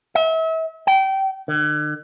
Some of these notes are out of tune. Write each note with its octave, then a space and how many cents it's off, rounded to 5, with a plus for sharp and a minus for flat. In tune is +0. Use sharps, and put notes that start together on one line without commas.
E5 -35
G5 -25
D3 +45